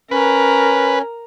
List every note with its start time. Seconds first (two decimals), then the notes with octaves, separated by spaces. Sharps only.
0.11 C#4 A#4 B4